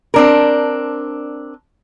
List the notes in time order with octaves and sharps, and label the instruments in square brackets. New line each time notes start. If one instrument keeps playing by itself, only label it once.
[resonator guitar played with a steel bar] C4 D4 A#4